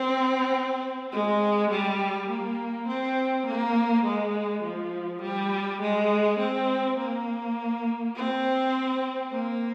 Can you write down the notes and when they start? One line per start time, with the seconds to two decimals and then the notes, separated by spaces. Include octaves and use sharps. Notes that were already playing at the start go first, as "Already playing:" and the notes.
Already playing: C4
1.12 G#3
1.70 G3
2.29 A#3
2.88 C4
3.46 A#3
4.05 G#3
4.63 F3
5.22 G3
5.81 G#3
6.39 C4
6.98 A#3
8.16 C4
9.32 A#3